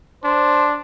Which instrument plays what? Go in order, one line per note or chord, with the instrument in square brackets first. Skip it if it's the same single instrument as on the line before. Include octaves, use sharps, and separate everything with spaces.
[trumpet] D4 [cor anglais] C5